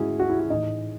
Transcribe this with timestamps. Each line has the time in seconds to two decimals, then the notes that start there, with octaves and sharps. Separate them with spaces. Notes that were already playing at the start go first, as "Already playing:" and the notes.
Already playing: G#2 G#3 C#4 E4 F#4 G#4
0.20 F#4
0.30 E4
0.40 F#4
0.50 A2 E3 D#4 D#5